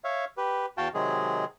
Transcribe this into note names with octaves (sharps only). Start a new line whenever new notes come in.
C#5 E5 F5
G4 B4
E2 F#4 F5 G5 A5
C3 D#3 F#3 G#3 G#4